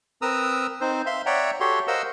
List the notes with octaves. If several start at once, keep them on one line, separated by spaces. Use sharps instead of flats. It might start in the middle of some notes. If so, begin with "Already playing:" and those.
C4 A#4 B4 A#5 D#6 E6
C4 D#4 C5
E5 F5 C6
C#5 D5 E5 F#5 G5 A#5
F#4 G4 A4 C#5 C6
A#4 C5 D#5 F5 F#5 E6